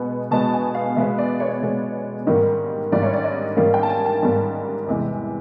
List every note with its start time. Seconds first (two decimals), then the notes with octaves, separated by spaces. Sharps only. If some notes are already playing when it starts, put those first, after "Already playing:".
Already playing: B2 G#3 B3
0.31 B2 G#3 B3 A5
0.54 G#5
0.75 F5
0.96 B2 G#3 B3 E5
1.18 D5
1.40 C#5
1.62 B2 G#3 B3
2.27 G#2 D#3 G3 A#3
2.92 G#2 D#3 G3 A#3 D5
3.03 C#5
3.14 D5
3.24 D#5
3.57 G#2 D#3 G3 A#3 F5
3.74 G5
3.83 A5
3.90 G#5
4.06 A5
4.23 G#2 D#3 G3 A#3
4.87 E2 C3 E3 G#3